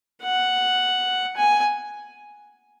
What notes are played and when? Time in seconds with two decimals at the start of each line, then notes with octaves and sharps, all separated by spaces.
0.23 F#5
1.37 G#5